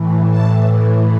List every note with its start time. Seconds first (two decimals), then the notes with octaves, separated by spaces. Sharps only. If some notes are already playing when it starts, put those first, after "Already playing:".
Already playing: A2 E3
0.30 A5